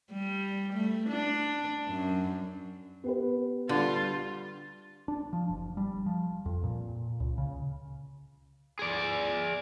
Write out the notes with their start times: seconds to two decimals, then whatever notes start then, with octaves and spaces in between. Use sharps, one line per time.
0.12 G3
0.73 A3
1.09 D4
1.88 F#2
3.04 B3 G4 B4
3.69 D3 G3 F4
5.08 D4
5.33 F3
5.49 F#1
5.77 G3
6.06 F3
6.46 F2
6.64 A#2
7.20 C#2
7.38 C#3
8.79 G#4 D5